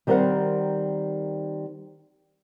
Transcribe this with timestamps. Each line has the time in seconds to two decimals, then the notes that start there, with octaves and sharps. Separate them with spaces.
0.07 D#3 G3 C4 A#4 C5 F#5